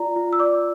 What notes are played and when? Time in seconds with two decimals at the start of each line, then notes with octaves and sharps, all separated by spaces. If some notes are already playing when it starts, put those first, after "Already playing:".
Already playing: F4 D5 A#5
0.16 F4
0.33 E6
0.39 D5 D6